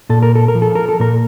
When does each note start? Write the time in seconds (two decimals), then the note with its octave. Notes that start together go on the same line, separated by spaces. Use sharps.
0.10 A#2 A4
0.23 A#4
0.35 A4
0.48 A#4
0.55 F3
0.62 A4
0.75 A#4
0.89 A4
1.00 A#2 A#4